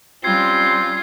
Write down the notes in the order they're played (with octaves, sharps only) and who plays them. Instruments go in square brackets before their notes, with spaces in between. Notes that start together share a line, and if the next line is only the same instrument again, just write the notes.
[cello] G3 C#4 [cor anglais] C4 [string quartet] F4 [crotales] G#6 C7